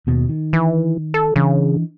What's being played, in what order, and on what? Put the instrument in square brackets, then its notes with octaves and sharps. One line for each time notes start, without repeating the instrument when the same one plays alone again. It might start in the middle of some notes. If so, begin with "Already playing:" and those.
[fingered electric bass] D#2 B2
D#3
[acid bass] E3
A4
[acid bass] C#3 [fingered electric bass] E3 D4